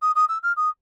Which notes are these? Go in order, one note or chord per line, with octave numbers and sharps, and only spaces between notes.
D#6
D#6
E6
F6
D#6